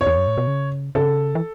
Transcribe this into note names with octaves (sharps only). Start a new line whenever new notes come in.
C#5
E2
F#2
A2
B2
C#3
C#3 A4
E3